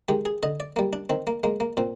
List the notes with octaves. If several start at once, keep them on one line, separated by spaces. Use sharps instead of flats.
D#3 G#3 G4
G#4
D3 D#5
D5
G3 A#3
D4
D#3 C4
A#3
G#3 A#3
A#3
A#2 C4